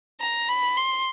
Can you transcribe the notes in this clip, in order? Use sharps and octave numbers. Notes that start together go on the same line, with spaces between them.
A#5
B5
C6